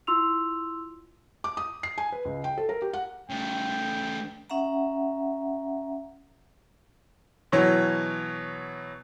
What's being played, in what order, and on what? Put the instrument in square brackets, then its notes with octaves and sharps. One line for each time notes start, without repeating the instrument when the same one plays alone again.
[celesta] E4 F4 C6 E6 F7
[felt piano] D6
D#6
C7
G#5
B4
C#2
G5
A4
A#4
G4
F#5
[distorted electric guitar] C#3 A3 [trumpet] G5
[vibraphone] C#4 E5 F#5 A#5
[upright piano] B2 E3 F#3 C#5